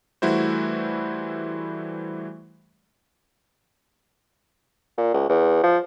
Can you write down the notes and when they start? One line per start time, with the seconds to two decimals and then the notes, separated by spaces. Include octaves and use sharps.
0.22 E3 G3 A3 E4 F#4 C5
4.98 A#2
5.14 C#2
5.29 E2
5.63 F3